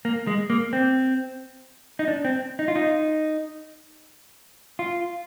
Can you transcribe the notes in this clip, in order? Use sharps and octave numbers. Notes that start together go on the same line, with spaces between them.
A#3
G#3
A#3
C4
D#4
D4
C4
D#4
F4
D#4
F4